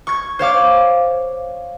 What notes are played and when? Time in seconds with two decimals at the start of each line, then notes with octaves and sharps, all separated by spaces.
0.07 C#6 G#6
0.39 C5 C#5 F5 D6